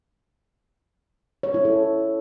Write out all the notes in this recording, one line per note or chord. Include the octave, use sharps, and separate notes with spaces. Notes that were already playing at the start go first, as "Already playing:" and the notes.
C#5
E4
A4